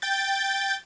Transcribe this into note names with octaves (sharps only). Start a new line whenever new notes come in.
G5 G6 A6